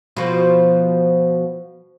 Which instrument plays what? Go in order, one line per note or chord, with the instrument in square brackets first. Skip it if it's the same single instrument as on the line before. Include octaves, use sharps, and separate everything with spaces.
[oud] B2 F3